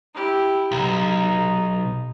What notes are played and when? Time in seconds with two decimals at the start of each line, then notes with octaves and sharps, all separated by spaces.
0.14 E4 G4
0.72 B1 D#4